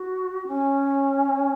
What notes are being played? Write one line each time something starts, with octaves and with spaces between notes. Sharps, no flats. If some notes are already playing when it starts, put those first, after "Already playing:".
Already playing: F#4
C#4